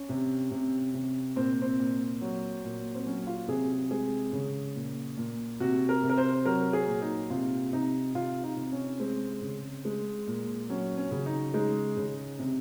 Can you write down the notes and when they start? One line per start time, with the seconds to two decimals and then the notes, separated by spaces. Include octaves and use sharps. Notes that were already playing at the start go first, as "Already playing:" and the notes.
Already playing: C#4
0.09 C3
0.51 C3
0.94 C3
1.36 A#2 C4
1.62 C4
1.79 A#2
2.21 F#3
2.64 A#2
2.94 C4
3.06 F#3 C#4
3.27 F4
3.48 C3 G#4
3.91 G#3 G#4
4.32 C#3
4.75 A#2
5.17 A#2
5.60 C3 F#4
5.89 A#4
6.03 C3
6.09 A#4
6.17 C5
6.45 F#3 A#4
6.73 G#4
6.87 A#2
7.02 D#4
7.30 C3 F4
7.72 C3 D#4
8.14 C3 F4
8.43 D#4
8.57 C3
8.72 C#4
9.00 G#3 C4
9.42 C#3
9.85 G#3
10.27 A#2
10.69 F#3 C#4
10.97 C#4
11.11 C#3
11.26 D#4
11.54 G#3 D#4
11.97 C#3
12.39 C3